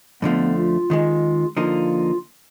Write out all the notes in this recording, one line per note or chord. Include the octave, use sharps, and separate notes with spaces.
F2 D3 F3 A3 B3
F4
D#2 D#3 G#3
D3 F3 A#3 D#4 F4